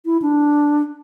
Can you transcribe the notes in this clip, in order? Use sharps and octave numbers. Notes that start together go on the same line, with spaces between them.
E4
D4